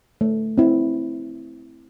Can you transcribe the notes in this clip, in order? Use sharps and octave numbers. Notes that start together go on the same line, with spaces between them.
A3
C4 E4